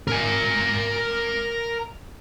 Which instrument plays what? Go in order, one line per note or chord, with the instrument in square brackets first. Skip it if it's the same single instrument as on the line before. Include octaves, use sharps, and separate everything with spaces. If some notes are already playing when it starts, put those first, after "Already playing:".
[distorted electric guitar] A#4 G#5